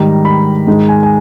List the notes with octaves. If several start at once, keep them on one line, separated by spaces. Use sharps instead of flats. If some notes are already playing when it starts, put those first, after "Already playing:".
Already playing: G#2 D#3 G3 A#5
B5
G#2 D#3 G#3
G#5
G#5